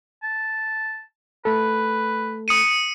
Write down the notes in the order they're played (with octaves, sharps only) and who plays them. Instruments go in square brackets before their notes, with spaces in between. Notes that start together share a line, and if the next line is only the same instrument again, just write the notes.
[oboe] A5
[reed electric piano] A3 A4 [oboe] B4
[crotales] D#6 C#7 D#7